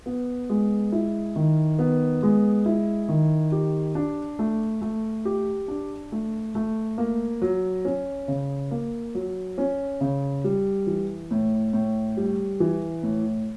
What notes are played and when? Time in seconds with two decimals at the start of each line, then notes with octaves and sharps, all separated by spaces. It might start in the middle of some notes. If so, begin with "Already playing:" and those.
0.06 B3
0.50 G#3
0.92 E4
1.36 D#3
1.79 B3
2.23 G#3
2.66 E4
3.09 D#3
3.52 G4
3.95 D4
4.39 A3
4.82 A3
5.25 G4
5.68 D4
6.12 A3
6.55 A3
6.98 A#3
7.42 F#3
7.85 C#4
8.28 C#3
8.71 A#3
9.15 F#3
9.58 C#4
10.01 C#3
10.44 G3
10.87 E3
11.31 A2
11.73 A2
12.17 G3
12.60 E3
13.03 A2